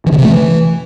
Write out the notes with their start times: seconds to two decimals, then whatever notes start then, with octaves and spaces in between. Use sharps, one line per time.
0.06 E3
0.12 D3
0.18 C3
0.24 A3
0.30 E3